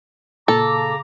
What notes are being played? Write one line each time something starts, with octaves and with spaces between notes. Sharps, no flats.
A#2 C#3 A4 A5 A#5 D6